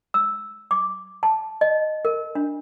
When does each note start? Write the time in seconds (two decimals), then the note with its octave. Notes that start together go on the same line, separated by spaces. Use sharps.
0.14 E6
0.71 D6
1.23 A5
1.61 D#5
2.05 A#4
2.35 D4